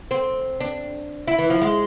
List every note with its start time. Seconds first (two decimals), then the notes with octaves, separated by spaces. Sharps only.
0.11 C4
0.60 D4
1.27 E4
1.39 E3
1.50 F3
1.61 G#3